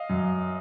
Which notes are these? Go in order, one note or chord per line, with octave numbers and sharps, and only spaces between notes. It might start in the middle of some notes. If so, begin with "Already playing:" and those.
Already playing: D#5 F5
F#2